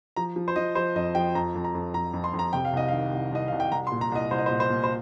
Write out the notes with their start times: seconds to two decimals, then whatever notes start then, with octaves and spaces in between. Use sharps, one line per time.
0.16 F3 A#5
0.36 F3
0.48 C5
0.56 F3 D#5
0.75 F3 C5
0.96 F2 D#5
1.15 F3 G5
1.35 F2 A#5
1.55 F2
1.64 A#5
1.75 F2
1.94 F2 A#5
2.14 F2
2.24 C6
2.34 F2
2.39 A#5
2.53 C3 G5
2.65 F5
2.73 C2 D#5
2.88 D#3 F5
3.13 C2
3.32 C2 D#5
3.48 C2 F5
3.60 G5
3.72 C2 A#5
3.87 C6
3.92 A#2
4.01 A#5
4.12 C2 D#5
4.31 C2 C5
4.38 D#5
4.46 C5
4.51 A#2
4.60 C5
4.70 A#2
4.84 C5